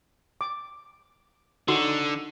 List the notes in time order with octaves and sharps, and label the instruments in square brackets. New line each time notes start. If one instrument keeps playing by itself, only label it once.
[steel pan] D6
[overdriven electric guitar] D3 [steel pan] D#4 F#4 C6